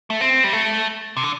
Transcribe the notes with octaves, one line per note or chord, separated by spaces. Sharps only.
A3
C4
G3
A3
C3
D3